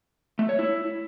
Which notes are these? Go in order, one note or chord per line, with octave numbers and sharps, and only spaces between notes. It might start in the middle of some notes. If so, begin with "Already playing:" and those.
A3
C#5
E4